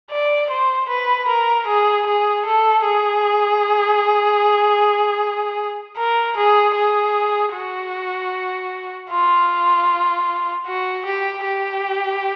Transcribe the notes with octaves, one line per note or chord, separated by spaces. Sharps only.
D5
C5
B4
A#4
G#4
G#4
A4
G#4
A#4
G#4
G#4
F#4
F4
F#4
G4
G4